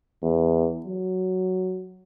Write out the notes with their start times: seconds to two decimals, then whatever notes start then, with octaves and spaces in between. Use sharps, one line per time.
0.23 E2
0.86 F#3